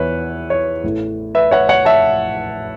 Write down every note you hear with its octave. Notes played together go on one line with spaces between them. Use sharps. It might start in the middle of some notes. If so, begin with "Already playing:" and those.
Already playing: E2 E3 B3 B4 C#5 E5
C#5
A1 A2 A3
B4 E5
C#5 F#5
C#5 F#5
E5 A5